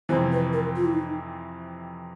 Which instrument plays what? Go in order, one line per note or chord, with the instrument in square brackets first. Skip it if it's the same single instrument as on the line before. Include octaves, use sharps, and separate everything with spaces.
[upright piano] F2 C3 E3 [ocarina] C5
[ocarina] B4
A#4
F4
E4
D#4